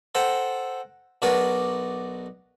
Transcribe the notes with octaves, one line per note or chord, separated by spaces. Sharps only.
A4 C5 F#5 G5 A#5
B1 D4 F#4 A#4 B4 D5